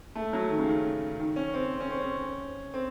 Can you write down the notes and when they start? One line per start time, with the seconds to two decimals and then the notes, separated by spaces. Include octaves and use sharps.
0.15 A3
0.33 F#3
0.50 D#3
0.58 C#3
0.68 D#3
1.19 D#3
1.36 C#4
1.54 C4
1.80 C#4
1.90 C4
1.99 C#4
2.74 C4